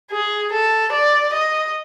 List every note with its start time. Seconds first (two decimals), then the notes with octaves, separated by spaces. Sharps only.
0.11 G#4
0.52 A4
0.92 D5
1.33 D#5